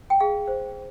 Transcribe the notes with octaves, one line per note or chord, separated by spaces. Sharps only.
G5
G#4 F5
C5